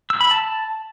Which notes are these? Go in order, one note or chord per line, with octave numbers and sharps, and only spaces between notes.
E6
B5
A5